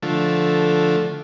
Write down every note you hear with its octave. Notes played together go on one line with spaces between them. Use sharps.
D3 F3 A3